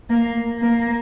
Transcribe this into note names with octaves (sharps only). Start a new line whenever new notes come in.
A#3
A#3